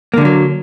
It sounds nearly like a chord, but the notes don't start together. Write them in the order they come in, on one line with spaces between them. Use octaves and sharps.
A#3 D3 G#3 F#3